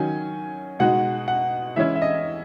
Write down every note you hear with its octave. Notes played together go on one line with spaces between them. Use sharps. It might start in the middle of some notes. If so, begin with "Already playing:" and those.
Already playing: D#3 F#3 C#4 F#4 G#5
B2 G#3 D#4 F#4 F#5
F#5
E3 G#3 C#4 E4 E5
E5
D#5